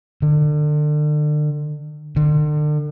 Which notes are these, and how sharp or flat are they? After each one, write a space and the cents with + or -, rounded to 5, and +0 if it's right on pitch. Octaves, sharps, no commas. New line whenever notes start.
D3 +35
D3 +40